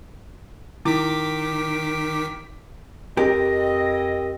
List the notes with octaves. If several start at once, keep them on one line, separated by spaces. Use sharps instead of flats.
D#3 E4 D6 B6
F2 C4 G4 A#4 D#5